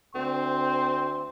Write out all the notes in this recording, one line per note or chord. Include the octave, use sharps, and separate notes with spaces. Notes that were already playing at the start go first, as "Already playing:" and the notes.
D2 C4 C6